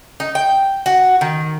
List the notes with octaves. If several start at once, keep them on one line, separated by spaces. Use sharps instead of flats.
D#4
G5
F#4
D#3